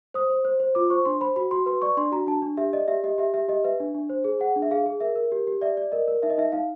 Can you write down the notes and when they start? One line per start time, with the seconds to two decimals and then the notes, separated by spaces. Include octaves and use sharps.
0.14 C5 D#6
0.30 C5
0.45 C5
0.60 C5
0.75 F4 D6
0.90 C5 C#6
1.05 D4 C6
1.21 C5 B5
1.36 F#4 B5
1.51 F#4 C6
1.66 B4 C6
1.82 D5 C#6
1.97 D4 C6
2.12 F#4 A#5
2.27 D4 A5
2.42 D4
2.57 G4 E5
2.73 D5 D#5
2.88 G4 E5
3.04 G4 D#5
3.18 G4 E5
3.34 G4 E5
3.48 G4 D#5
3.64 B4 E5
3.80 D4
3.95 D4
4.09 C5
4.24 G#4
4.40 G#4 F#5
4.56 D4
4.62 E5
4.71 G#4 F5
4.86 G#4
5.00 A#4 E5
5.16 A#4
5.32 G4
5.47 G4
5.61 D5 E5
5.77 D5
5.92 A#4 D#5
6.08 A#4
6.23 D#4 E5
6.30 D#5
6.38 D#4 E5
6.52 D#4 F5